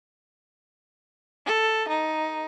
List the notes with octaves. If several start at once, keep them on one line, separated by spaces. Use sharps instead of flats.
A4
D#4